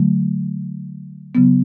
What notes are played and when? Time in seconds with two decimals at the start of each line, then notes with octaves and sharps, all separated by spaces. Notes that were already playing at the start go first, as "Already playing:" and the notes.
Already playing: D3 F#3 A3
1.35 C#3 F#3 B3